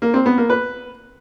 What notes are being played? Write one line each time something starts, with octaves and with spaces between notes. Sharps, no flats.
A#3
C4
B3
A#3
B4